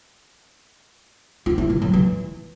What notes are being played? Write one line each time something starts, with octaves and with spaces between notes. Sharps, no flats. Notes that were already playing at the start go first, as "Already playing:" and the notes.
F4
E4
E3
F#3
E3